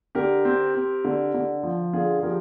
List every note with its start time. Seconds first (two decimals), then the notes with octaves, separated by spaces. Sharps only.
0.15 D3 G4 A#4
0.45 C4
0.75 C4
1.05 D3
1.34 D3
1.63 F3
1.93 D3 F4 G#4
2.19 G#4
2.23 F3 G4 A#4